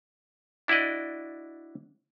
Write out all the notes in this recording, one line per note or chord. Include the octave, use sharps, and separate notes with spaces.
D4 E4 F#4 D5 D#5